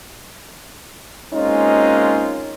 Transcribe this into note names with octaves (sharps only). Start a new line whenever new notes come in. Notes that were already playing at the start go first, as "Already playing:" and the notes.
G#3 A#3 C4 C#4 D#4 F4